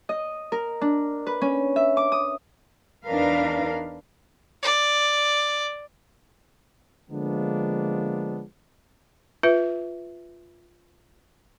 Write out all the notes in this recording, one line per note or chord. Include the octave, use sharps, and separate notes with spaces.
D#5
A#4
D4
B4
C#4
E5
D6
D#6
E2 D4 D#4 A#4 B4 F5
D5
D3 F3 G#3 A#3 B3 D4
F4 B4 E5